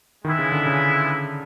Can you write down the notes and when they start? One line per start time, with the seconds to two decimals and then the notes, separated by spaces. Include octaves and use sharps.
0.25 D#3 G#3 B3 E4
0.39 C#3
0.52 D3
0.66 C#3